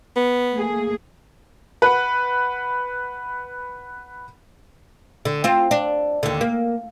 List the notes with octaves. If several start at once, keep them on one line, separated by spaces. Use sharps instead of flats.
B3
A3 A#3 G#4
B4 F#5
D3
C4 F4
D4
D#2 D3
A#3